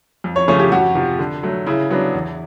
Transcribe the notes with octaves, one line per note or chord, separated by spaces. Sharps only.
F2
C#5
C#3 F3 A3 C#4 C#5
G4
F2 F#4
C3 F3
D3
F#3 A3
C#3 E4
F#3 B3 D4
E2